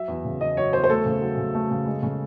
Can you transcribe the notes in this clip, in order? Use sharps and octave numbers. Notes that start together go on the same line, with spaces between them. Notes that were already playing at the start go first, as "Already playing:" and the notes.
Already playing: F#3 E5
E2
C#3
E2 D#5
F#3 C#5
E2 C5
C5
A3 A4
C#3
F#3
C#3
A3
C#3
G#3
C#3